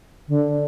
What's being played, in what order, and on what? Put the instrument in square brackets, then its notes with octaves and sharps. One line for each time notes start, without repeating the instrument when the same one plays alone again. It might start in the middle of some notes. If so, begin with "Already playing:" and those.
[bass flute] D3